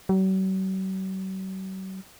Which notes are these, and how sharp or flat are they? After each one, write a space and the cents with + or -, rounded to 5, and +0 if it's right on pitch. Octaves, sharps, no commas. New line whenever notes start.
F#3 +45